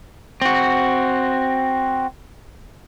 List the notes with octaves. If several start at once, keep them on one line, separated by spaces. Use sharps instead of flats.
C4 F#4